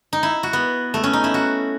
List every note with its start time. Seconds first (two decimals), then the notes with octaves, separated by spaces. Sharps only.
0.13 D#4
0.23 E4
0.43 F#4
0.53 B3
0.94 A3
1.04 C#4
1.13 D#4
1.24 E4
1.34 F#4